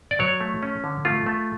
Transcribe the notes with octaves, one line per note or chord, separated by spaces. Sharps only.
D5
F#3 C#5
A3
C#4
D3
A3 F4
A3